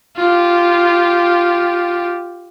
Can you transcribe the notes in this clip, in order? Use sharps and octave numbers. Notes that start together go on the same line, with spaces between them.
F4 G4